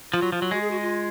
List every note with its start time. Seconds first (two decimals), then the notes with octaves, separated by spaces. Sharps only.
0.13 F3 F4
0.22 F#3
0.32 F3 F4
0.42 F#3
0.51 G#3 F#4
0.61 G#4
0.71 F#4
0.81 F4